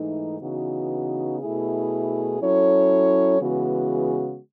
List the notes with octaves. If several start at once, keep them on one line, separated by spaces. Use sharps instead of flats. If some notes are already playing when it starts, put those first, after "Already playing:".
Already playing: G#2 E3 A3 D#4
C#3 E3 B3 D#4 F#4
B2 A3 E4 G#4
F#3 C#4 E4 A4 C#5
C#3 E3 G#3 B3 F#4